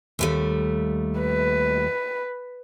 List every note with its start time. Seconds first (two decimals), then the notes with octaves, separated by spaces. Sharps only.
0.19 D#2 G3 A3
1.20 B4